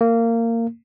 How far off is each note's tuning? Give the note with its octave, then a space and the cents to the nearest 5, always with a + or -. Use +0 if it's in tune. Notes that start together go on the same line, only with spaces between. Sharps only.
A#3 -20